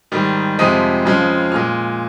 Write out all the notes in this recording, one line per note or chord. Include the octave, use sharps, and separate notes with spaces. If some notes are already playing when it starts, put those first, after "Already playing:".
G#2 D#3 G3
F2 C3 F3 G#3 D#6
F2 C#3 F3 G#3
A#2 G#3 F6